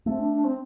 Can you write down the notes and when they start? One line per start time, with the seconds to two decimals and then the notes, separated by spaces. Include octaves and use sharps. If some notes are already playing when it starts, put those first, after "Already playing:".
0.06 A3 C4
0.19 D4
0.33 D4
0.44 C4